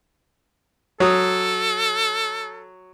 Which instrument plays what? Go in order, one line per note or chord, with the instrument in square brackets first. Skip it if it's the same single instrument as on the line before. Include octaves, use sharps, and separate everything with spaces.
[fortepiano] F#3 D#6 [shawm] A4